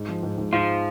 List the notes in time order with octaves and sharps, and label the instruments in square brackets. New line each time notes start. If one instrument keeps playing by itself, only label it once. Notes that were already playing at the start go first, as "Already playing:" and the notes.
Already playing: [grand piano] G#2
F3
G#2
G#2
[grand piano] G#2 [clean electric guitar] F3 F4